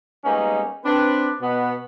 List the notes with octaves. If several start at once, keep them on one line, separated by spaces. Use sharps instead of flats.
G3 G#3 A#3 B3 C#4 D#4
C4 D4 B4
B2 B3